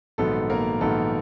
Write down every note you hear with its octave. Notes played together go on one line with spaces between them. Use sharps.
A#1 G#2 D#3 F#3 B3 A4
A#3 A#4
A#1 G#2 D#3 F#3 B3 A4